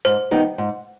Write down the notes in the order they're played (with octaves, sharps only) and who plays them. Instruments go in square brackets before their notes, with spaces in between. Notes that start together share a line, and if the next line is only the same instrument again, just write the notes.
[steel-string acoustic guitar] G#2 [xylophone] C5
[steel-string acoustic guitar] D#3 G3 B3 D#4
G#2